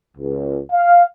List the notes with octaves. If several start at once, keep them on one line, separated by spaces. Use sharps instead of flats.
C#2
F5